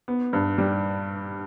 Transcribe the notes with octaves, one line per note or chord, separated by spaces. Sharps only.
B3
G2
G3